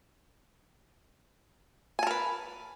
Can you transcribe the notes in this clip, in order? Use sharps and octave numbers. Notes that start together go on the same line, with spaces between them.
A#4 B4 G#5 A5